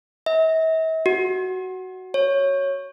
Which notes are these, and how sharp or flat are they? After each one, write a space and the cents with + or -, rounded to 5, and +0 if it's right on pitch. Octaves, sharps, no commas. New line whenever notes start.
E5 -45
F#4 +10
C#5 -5